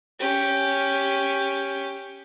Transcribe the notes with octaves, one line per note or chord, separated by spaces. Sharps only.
C#4 G4